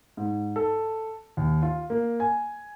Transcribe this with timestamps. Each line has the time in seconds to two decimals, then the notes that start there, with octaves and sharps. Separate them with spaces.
0.17 G#2
0.56 A4
1.37 D#2
1.62 F4
1.90 A#3
2.20 G#5